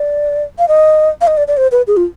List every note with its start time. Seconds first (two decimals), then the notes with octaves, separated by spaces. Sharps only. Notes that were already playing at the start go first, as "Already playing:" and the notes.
Already playing: D5
0.59 F5
0.68 D#5
1.21 F5
1.27 D#5
1.37 D5
1.48 D5
1.57 C5
1.72 B4
1.87 G#4
1.97 F4